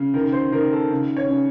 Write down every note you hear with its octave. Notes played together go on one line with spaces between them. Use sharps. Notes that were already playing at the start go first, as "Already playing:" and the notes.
Already playing: C#3
D#3 A#4
C5
D#3 A#4
A4
C#3
C#5
C#3